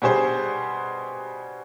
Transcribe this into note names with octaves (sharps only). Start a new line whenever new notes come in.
B2 G3 D4 G#4 C5